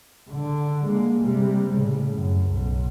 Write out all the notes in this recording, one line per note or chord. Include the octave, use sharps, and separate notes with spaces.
D3
G#3 A#3
C3 G3
A2 C#3
F#2
B1